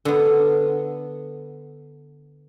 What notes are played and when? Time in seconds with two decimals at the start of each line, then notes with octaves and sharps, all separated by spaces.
0.05 D3 B3